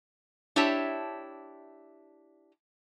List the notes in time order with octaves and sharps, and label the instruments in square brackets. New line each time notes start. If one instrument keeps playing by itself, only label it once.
[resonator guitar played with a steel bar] D4 E4 G4 C#5 E5 A5